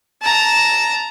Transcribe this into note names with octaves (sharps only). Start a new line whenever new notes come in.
A5 A#5